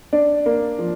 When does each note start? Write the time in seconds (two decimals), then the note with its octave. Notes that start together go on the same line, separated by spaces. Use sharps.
0.13 D4
0.46 A#3
0.79 F3